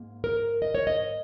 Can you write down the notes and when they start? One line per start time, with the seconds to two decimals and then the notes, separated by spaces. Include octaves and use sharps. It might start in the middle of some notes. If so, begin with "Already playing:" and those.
Already playing: G#2 A#3
0.24 A#4
0.62 D#5
0.75 C#5
0.87 D#5